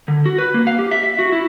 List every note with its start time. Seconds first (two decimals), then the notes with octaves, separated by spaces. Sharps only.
0.08 D3
0.26 F#4
0.38 B4
0.54 A#3
0.67 F5
0.79 G4
0.91 E5
1.03 E5
1.19 F#4
1.32 E4